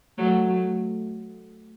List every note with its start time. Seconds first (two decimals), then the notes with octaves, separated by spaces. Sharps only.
0.18 F#3 A3
0.46 F#3 A3